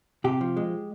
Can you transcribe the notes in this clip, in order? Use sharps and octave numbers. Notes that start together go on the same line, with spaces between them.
C3 G4
F3
G#3